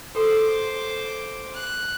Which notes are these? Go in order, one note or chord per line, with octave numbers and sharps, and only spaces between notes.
G4 A4 C5 D6
F#6